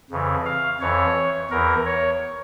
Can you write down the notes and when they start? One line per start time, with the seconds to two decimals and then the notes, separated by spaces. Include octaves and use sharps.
0.11 F2 C#3 E3
0.45 F5
0.80 F2 E3 C#5
1.51 E2 E3 A#4
1.85 C#5